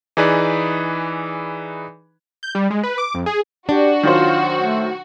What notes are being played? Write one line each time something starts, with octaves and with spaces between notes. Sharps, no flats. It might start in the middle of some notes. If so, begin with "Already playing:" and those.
E3 D#4 G#4 B4 D5 B5
G6
G3
G#3
B4
D6
F2
G#4
D4 F#4 G4
D#3 F#3 F4 C5
A3